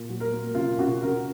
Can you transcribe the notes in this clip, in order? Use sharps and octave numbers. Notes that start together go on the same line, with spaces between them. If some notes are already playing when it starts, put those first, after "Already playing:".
Already playing: A#2
F#3
A#4
A#3
C#3 F4
C#3 F#4
C#3 A#4